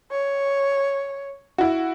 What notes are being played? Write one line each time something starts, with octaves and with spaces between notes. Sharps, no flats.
C#5
E4 F#4